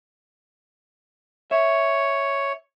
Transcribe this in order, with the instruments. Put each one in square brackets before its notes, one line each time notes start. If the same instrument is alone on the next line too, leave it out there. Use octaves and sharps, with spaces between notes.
[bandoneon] C#5 [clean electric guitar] E5